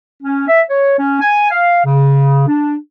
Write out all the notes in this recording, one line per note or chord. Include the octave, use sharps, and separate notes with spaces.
C#4
E5
C#5
C#4
G#5
F5
C#3
D4